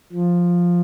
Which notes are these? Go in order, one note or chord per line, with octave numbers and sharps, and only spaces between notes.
F3